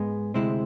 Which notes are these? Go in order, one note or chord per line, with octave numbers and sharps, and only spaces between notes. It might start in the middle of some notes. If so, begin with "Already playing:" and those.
Already playing: G#2 G#3 B3
D2 C3 G#3 C4 E4